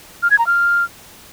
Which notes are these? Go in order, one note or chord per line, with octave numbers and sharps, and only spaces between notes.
F6
G#6
A#5
F6